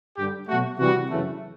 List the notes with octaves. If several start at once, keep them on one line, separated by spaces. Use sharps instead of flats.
G2 D3 G3 G4
B2 F#3 A3 F#4
C3 E3 G3 F#4
F#2 C#3 E3 A3